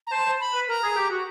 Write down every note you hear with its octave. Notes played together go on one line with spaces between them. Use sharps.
A#5
C5 A5
C5
B5
B4
A#4 A#5
G#4
G4
F#4